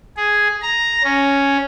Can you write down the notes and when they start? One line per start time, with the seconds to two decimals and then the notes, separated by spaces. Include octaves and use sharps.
0.17 G#4
0.62 A#5
1.04 C#4